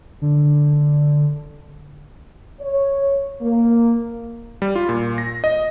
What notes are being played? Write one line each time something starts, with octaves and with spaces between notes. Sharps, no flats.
D3
C#5
A#3
G3
F4
A#2
A#6
D#5